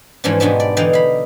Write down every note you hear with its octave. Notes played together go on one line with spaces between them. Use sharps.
G#2 E3 F3 C#4 D4
G#2 B2 B3 D4 G4
D5
D3 E3 D#4 D5 F5 G5
F5 B5